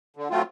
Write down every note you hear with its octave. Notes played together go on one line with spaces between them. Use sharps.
D3
F#3 A3 C4 F4